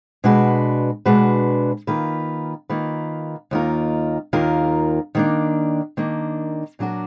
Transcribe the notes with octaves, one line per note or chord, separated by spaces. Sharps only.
B2 G#3 D4 F#4 B4
B2 G#3 D4 F#4 B4
D#3 A#3 F4 B4
D#3 A#3 F4 B4
D#2 D#3 A#3 F4 A#4
D#2 D#3 A#3 F4 A#4
D#3 A#3 D4
D#3 A#3 D4
A#2 F#3 D4 F#4 A#4